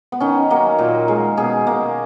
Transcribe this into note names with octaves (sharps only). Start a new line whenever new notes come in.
B3
D#3 C#4
F#3 A#3
A#2
G#3
B2 G#4
A#3